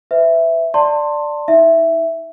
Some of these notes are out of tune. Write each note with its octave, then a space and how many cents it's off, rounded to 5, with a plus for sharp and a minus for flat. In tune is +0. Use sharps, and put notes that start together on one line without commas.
B4 +40 E5 +0
D5 +5 A5 +30 C6 +15
D#4 +30 E5 +5